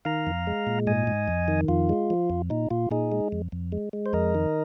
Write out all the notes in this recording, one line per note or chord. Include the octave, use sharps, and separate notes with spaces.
D#3 F5 A#5
F2
G#3
A#2
G#2 D#5 G#5
G#2
F2
D#3
F2 F4
G#3
F3
F2
A#2 D#4
A#2 F4
A#2 D#4 G#4
G#3
F2
F2
G#3
G#3
C5
F2 A#4 D#5
D#3